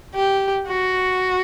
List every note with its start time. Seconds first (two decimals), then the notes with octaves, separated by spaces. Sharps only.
0.15 G4
0.68 F#4